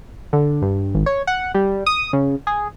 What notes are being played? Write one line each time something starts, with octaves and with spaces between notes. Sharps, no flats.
D3
G2
G#1
C#5
F#5
G3
D#6
C#3
G#4